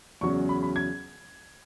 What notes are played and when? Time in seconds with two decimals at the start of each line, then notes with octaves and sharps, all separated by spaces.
0.21 E2 C#3 F#3 C#6
0.49 B5
0.63 B5
0.76 G#6